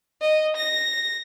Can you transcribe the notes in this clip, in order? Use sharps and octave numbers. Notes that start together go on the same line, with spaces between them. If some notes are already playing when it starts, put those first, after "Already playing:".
D#5
A#6